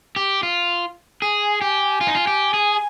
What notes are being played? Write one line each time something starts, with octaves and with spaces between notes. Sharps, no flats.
G4
F4
G#4 G#5
G4
F4
D#4
F4
G4
G#4